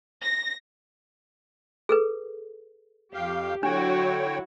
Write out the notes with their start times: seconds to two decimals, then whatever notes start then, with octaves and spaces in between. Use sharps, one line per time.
0.22 A#6
1.89 G#4 A4 B4
3.14 F2 G4 F5
3.63 D3 F#3 D4 E4 F#4 C#5 G5